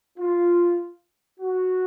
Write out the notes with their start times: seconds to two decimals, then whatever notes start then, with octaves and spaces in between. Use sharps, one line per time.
0.18 F4
1.40 F#4